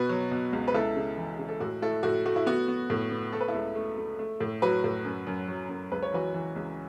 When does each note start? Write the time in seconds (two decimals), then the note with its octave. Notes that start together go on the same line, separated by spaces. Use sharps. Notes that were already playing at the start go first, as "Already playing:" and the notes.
Already playing: B2 F#4 B4
0.09 F#3
0.31 B2
0.53 C#2
0.68 B4
0.74 C#2 E4 A4
0.96 C#3
1.17 E3
1.38 C#3
1.49 A4
1.60 A2 F#4
1.82 A3 E4 A4
2.03 A2 F#4
2.25 A3 F#4
2.36 E4
2.46 B3 F#4
2.68 B3
2.90 A2
3.11 B3
3.33 A3 A4
3.41 B4
3.48 E4 A4
3.54 C#2
3.75 A3
3.98 A3
4.19 A3
4.40 A2
4.62 F#3 F#4 B4
4.84 A2
5.05 F#2
5.27 F#2
5.48 F#3
5.69 F#2
5.92 C#2 B4
6.03 C#5
6.13 E3 F#4 B4
6.34 E3
6.56 C#2